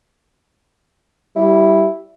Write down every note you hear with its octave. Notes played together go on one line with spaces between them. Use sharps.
G3 E4